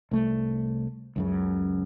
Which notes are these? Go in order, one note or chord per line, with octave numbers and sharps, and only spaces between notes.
C2 A3
C#2 F#2 C#3